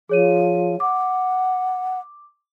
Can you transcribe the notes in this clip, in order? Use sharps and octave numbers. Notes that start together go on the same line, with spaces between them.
F3 G#4 C#5 D#7
F#5 D6